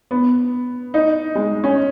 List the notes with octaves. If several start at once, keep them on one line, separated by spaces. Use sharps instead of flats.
B3
D#4
G#3
C#4